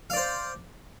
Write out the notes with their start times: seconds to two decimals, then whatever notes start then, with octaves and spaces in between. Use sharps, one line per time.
0.10 F5
0.13 D5
0.17 C5